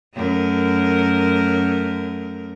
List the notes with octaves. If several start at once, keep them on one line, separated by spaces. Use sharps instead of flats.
F#2 A3 A#4